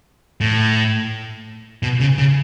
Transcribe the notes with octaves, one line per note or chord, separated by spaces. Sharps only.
A2
B2
C#3
C#3